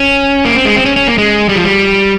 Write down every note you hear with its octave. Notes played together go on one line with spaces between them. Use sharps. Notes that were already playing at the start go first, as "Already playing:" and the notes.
Already playing: C#4
A#3
C4
G#3
C4
C#4
C#4
A#3
G#3
G3
F3
G3